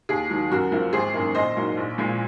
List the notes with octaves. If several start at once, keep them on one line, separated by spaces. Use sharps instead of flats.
D#2 G#4
D#3 F#3
F#2 F#4 A#4
F3 A#3
G#1 G#4 C5
F#2 D#3 A#3
A#1 C5 D#5
G#2 F#3 A#3
A#1
A#2 F3 G#3